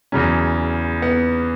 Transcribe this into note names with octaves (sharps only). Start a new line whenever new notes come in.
E2 C#3 F#3 C#4
B3